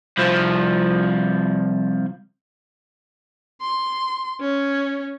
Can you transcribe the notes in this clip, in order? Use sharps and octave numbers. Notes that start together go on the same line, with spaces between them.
C2 F3
C6
C#4